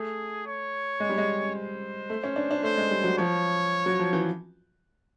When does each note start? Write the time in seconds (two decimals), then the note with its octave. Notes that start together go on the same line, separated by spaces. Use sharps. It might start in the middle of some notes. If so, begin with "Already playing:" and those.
Already playing: A3 G#4
0.47 C#5
1.00 G#3
1.09 G3
1.18 G#3
1.55 C5
2.10 A3
2.24 C#4
2.36 D4
2.51 D4
2.63 A3 C5
2.77 G#3
2.91 G3
3.04 F#3
3.18 F3 C#5
3.86 F#3
3.99 F3
4.13 E3